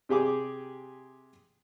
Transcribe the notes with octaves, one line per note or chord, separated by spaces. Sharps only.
C3 G4 G#4 D6